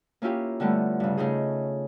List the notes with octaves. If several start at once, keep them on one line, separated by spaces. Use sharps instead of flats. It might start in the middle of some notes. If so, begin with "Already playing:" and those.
A#3 C#4 E4 F4 G4
D3 G3 A3 B3
G2 C#3
C#3 A3 D#4 G#4